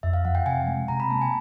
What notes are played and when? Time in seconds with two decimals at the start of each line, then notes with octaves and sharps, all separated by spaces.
0.03 F2 E5
0.13 F5
0.25 F3 F#5
0.35 G5
0.46 C3 G#5
0.68 G#3
0.88 C3 A#5
1.00 B5
1.10 A#3 A5
1.21 G#5